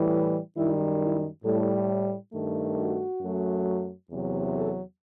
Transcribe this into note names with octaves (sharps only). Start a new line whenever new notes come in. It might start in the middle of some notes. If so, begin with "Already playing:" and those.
Already playing: A2 E3 G3
E4
F#2 D#3 G3 E4
E4
A2 G3 A4
G2 D#3 A3
F#4
F#2 F#3 A3
E2 C3 F#3
A4